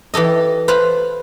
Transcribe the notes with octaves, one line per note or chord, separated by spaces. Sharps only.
E3 G4 A4 D#5
B4 C5 F5 A5 B5